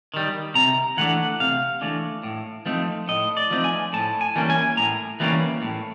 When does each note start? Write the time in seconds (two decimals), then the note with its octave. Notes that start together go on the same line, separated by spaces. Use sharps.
0.14 D#3 G3
0.55 C3 A#5
0.97 E3 A3 D4 F#5
1.40 C3 F5
1.81 E3 A3 D4
2.23 A2
2.66 F3 A3 C4 D#4
3.08 A2 D#5
3.37 D5
3.50 F3 A3 C4 D#4
3.64 G#5
3.93 A2 A5
4.21 G#5
4.35 E3 G3 A#3 C#4
4.50 G#5
4.77 A2 A#5
5.20 E3 G3 A#3 C#4
5.62 A2